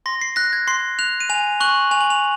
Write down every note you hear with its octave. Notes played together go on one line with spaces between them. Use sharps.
C6 A#6
C7
F#6 A#6
G#6
C6 C7
F#6 F7
D#7
G#5 F7
C#6 F#6 F#7
G#5 F7
F#7
F7